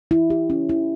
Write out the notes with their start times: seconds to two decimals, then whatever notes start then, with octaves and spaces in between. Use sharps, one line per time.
0.11 E4
0.30 G4
0.50 C#4
0.69 E4